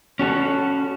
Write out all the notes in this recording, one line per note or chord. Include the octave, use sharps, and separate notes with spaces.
C#4 F#4 A4